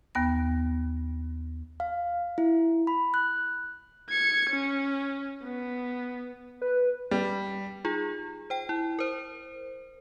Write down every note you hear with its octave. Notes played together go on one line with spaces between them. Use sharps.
D#2 B3 A#6
F5
E4
B5
F#6
G#6 C#7
C#4
B3
B4
G3
D#4 F4 G#4
C5 G5
E4
A#4 C5